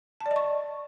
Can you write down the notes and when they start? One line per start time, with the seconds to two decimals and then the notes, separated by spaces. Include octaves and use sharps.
0.21 A5
0.26 D5
0.31 D#5
0.36 C#6